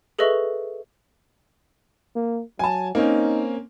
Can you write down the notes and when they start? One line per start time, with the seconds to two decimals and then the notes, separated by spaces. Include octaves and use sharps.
0.19 G#4 A4 B4 D#5 E5 C#6
2.15 A#3
2.59 F#3 G#5 A5
2.95 A#3 C4 C#4 D#4